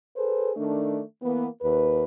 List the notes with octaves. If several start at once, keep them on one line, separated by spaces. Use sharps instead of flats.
G#4 A4 B4 C5
D#3 A3 D4
E3 A#3 B3
D#2 B4